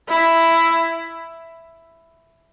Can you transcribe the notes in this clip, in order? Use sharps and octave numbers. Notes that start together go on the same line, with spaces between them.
E4